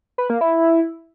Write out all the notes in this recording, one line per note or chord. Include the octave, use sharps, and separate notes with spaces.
B4
A#3
E4